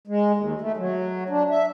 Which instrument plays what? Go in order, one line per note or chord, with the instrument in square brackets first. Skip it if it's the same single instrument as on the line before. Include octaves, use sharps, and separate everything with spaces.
[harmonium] G#3
D#2
A3
F#3
D4
E5